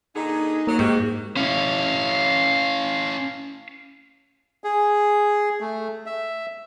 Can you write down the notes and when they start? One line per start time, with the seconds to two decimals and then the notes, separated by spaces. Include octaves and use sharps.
0.14 A#2 D3 D#4 G#4
0.67 F#3 A#3
0.79 G#2 F#4 G4
1.37 C#4 E4 F5
4.64 G#4
5.60 A3
6.06 E5